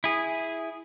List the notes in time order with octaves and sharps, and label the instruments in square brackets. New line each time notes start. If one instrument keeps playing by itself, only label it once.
[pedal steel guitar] E4 G#4